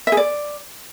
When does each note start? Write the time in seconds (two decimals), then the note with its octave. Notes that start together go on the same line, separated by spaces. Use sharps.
0.07 E5
0.12 G#4
0.17 D5